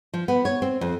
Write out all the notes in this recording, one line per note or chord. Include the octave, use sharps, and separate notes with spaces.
F3
B3
C#5
C4
F2